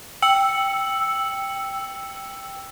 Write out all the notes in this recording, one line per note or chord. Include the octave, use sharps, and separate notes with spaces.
G5 E6 C#7 F#7